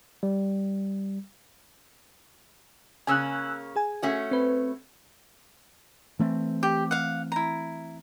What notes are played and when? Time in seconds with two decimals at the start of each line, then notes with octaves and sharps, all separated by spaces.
0.23 G3
3.07 C#3 A#3 C#4 G#5 E6 F#6
3.76 G#4 G#5
4.02 A3 C#4 F#4
4.31 C4 B4
6.19 E3 A3 C4
6.63 G4
6.91 F5 F#5
7.32 E4 A#5